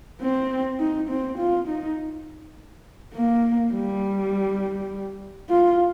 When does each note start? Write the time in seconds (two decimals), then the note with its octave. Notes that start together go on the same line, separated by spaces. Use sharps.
0.21 C4
0.80 D#4
1.09 C4
1.38 F4
1.68 D#4
3.14 A#3
3.73 G3
5.49 F4